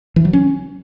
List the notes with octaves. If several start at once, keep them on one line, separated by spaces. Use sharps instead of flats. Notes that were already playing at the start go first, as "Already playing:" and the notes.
E3
F#3
C#4